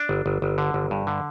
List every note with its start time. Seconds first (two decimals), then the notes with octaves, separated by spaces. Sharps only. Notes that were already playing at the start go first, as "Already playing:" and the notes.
Already playing: D4
0.09 G1
0.26 G1
0.42 G1
0.58 D3
0.74 G1
0.91 G2
1.07 D3